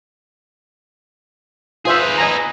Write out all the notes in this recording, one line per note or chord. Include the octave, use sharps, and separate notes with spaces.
F4 G#4 B4 C5 E5
D#5 G#5 A#5